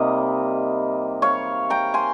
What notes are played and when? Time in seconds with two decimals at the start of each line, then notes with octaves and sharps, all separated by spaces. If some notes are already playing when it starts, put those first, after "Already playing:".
Already playing: C3 G3 A#3 D#4 D#5
1.22 C#5 F5
1.70 G5 A#5
1.94 G#5 C6